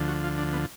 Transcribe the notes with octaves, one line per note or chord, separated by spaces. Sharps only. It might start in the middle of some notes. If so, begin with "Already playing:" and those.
Already playing: D2 D3 F3
F#4
F4
D4
B3